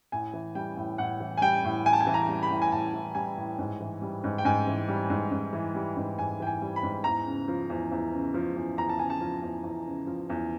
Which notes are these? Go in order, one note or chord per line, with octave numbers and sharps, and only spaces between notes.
A2 G#5
E3
G3 G5
A2
A2 F#5
E3
G#5
G3 G5
A2
A2 G#5
A5
G#5
E3
A#5
G3
B5
A2
G#5
A2 A5
E3
G3 G#5
A2
G#2
E3
G3
G#2
G5
G#2 G#5
E3
G3
G#2
G#2
E3
G3
G#2
G#2 G#5
E3 G5
G#5
G3
B5
G#2
E2 A#5
C#3
F3
E2
E2
C#3
F3
E2
E2 A#5
A5
C#3 G#5
A5
F3
E2
E2
C#3
F3
E2